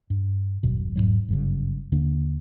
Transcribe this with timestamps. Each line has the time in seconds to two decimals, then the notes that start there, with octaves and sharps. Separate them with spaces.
0.10 G2
0.63 D#1 G#1 F#2 B2
0.96 E1 F2 G#2 F#3
1.28 G1 F#2 C#3
1.92 D#2 D3 A#3 D4